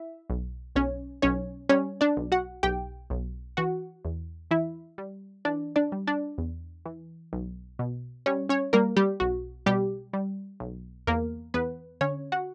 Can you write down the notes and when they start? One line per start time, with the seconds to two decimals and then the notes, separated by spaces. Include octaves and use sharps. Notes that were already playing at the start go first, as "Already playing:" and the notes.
Already playing: E4 E5
0.30 B1
0.76 B1 C#4 C#5
1.22 B1 C#4 C#5
1.69 G3 C#4 C#5
2.01 D4 D5
2.17 B1
2.32 F#4 F#5
2.63 B1 G4 G5
3.10 B1
3.57 E3 F#4 F#5
4.05 E2
4.51 E3 E4 E5
4.98 G3
5.45 E3 D4 D5
5.76 D4 D5
5.92 G3
6.07 D4 D5
6.38 E2
6.86 E3
7.33 B1
7.79 B2
8.26 G3 C#4 C#5
8.49 C#4 C#5
8.73 G3 A#3 A#4
8.97 G3 G4
9.20 B1 F#4
9.66 B2 G3 G4
10.13 G3
10.60 B1
11.07 E2 A#3 A#4
11.54 E2 B3 B4
12.01 D3 C#4 C#5
12.32 F#4 F#5